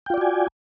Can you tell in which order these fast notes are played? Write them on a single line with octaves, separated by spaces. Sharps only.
G5 F4 D5 F#4 G#5